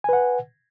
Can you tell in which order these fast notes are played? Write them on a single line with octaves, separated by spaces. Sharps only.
G#5 B4 F#5